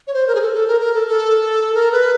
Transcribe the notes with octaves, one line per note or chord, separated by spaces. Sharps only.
C#5
C5
A#4
G#4
A4
A4
A#4
A#4
A4
A4
A#4
B4